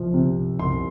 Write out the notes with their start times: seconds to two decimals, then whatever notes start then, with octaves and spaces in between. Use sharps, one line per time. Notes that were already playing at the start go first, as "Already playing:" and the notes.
Already playing: C2 F3
0.14 C3
0.59 C2 C6